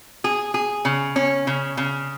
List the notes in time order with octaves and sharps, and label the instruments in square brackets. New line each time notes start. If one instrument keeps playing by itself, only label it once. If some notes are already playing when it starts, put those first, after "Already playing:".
[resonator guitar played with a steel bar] G#4
G#4
C#3
C#4
C#3
C#3